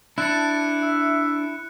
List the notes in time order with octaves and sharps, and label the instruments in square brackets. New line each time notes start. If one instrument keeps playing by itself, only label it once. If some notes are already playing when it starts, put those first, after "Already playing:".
[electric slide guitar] D4 [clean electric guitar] E4 [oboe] A5 [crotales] F#6 C#7
[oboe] E5